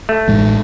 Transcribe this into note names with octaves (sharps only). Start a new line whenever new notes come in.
A3
A1 A2 G#3